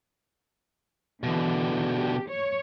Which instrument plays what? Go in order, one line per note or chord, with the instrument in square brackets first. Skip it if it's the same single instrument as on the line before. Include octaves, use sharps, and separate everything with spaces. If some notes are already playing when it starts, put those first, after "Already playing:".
[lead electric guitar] B2 D3 [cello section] E3
[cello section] G4
C#5